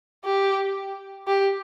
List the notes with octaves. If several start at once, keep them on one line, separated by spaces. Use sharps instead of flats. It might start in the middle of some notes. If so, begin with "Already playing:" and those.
G4
G4